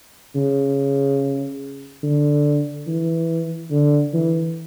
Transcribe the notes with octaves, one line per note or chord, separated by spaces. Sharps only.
C#3
D3
E3
D3
E3